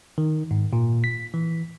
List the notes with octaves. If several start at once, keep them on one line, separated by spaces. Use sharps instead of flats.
D#3
G#2
A#2
B6
E3